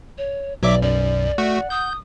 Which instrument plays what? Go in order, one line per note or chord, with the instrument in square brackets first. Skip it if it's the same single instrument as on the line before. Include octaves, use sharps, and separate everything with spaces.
[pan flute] C#5
[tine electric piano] B1 [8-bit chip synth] F#3 E5 D6 [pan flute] D5
[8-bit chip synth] F#2 [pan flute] D5
[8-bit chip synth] A3 F#4 [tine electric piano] F#5
[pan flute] D#6 [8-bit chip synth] G6